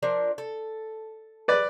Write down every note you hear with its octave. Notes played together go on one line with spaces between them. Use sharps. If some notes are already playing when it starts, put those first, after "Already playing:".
F3 D4 A#4
A4
B4 D5